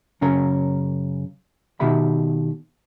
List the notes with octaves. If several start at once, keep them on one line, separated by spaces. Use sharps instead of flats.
F#2 C#3 C#4 A#4
B2 D#3 G4 E5 B5